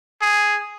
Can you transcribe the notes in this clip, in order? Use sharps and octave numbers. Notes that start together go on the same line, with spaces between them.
G#4